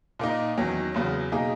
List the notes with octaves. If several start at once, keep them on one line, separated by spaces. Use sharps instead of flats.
A#2 A#3 D#4
E2 D#3 F#3 C#4
E2 C#3 F#3 B3
B2 A#3 D#4 G#4